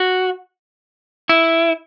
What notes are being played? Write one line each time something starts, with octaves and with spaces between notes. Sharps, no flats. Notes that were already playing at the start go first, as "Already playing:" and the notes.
Already playing: F#4
E4